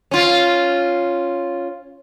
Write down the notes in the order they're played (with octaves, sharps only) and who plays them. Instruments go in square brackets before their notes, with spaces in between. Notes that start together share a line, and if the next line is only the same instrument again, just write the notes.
[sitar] C#4 F4